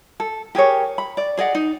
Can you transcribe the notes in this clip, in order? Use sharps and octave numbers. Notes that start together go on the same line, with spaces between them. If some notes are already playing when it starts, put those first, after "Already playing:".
A4
G4 G#4 A#4 C#5
B5
D5
G#4 D5 D#5 F#5
D#4